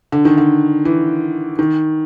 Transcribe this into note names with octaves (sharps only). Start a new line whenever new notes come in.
D3
D#3
D3
E3
D#3